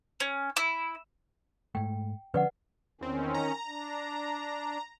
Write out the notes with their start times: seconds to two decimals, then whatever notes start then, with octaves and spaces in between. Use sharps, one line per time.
0.20 C#4
0.57 E4
1.75 G#2 A3 G5
2.34 D3 F3 C#4 B4 D5 F#5
3.01 E2 D#3 C4 C#4
3.35 A#5
3.66 D4